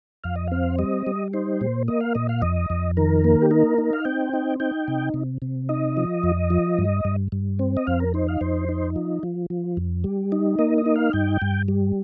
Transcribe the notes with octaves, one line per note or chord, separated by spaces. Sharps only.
F2 F5
D#5
C4 F5
G3 D#5
G3
D#4 C5
A#2
A#3 D#5
F5
A#2 D#5
F5
F2 D#5
F2
D#3 A#4
A#3
G4
D#4 A#4
D#4
F5
C4 G5
D#4
D#4 G5
C3
C3
C3
D#4 D#5
F3
F2
F3
G2
G2
G2
C4
D#5
F2 F5
A#4
D#4 C5
F5
F2 C5
D#4
F3
F3
F3
F2
G3
D#4
A#3 D#5
D#5
D#4
F5
G2 G5
G2
G3